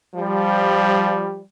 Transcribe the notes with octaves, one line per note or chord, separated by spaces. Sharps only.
F3 G3